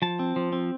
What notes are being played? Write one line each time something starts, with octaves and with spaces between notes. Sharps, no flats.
F3 A5
C4
F3
C4